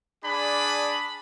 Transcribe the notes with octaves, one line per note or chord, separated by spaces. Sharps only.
D4 G#4 D5 B5